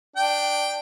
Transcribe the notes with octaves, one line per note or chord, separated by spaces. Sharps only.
D4 G5